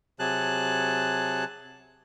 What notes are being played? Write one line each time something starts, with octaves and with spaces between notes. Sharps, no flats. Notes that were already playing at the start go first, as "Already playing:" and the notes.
C3 F#3 G#4 A5 F#6